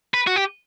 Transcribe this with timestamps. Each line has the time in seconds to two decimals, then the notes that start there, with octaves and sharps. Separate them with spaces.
0.14 B4
0.27 F#4
0.36 G4